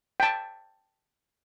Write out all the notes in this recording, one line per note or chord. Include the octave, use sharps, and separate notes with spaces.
G5 A5